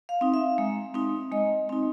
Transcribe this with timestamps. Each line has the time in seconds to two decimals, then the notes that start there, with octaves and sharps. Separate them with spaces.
0.09 F5
0.21 C4 D#4
0.34 E5
0.58 G#3
0.94 C4 D#4
1.32 G#3 D#5
1.69 C4 D#4